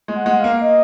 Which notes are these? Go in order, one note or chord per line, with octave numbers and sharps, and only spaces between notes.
G#3
F#5
G#3
F5
A#3
D#5